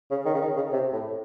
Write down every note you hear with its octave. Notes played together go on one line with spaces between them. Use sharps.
C#3
D#3
C#3
D#3
C#3
C3
A2